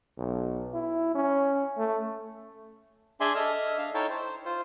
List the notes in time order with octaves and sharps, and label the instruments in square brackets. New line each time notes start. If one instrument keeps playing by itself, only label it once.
[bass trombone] B1
E4
C#4
A3
[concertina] D4 G#4 D5 E5 G#5 C6
A4 D#5 E5 F6
D4 F5
D#4 E4 A4 C#5 G5 A5
C5
F4 C5